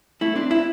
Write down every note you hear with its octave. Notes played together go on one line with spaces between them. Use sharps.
A3 E4
C4 D4
E4